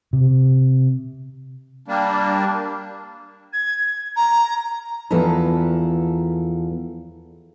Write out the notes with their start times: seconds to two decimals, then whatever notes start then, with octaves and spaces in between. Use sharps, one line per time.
0.13 C3
1.88 G3 A#3 D4
3.53 G#6
4.16 A#5
5.11 E2 F3 A4 B4 A#5